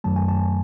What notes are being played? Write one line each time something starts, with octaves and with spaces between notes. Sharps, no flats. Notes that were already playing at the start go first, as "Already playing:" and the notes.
F#2 D#3 F#3 A3 A5
G#5
A5